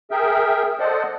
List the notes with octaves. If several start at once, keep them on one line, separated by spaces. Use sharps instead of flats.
G#4 A#4 E5 G5
A4 C5 D5 D#5 F#5